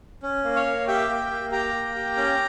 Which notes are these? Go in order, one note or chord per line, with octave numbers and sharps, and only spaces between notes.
C#4
A#3
C#5 F5
A#3
G4 E5 G5
A#3
A#3
G4 G5 A#5
A#3
G4
C#4